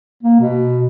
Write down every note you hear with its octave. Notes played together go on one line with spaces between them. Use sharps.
A#3
B2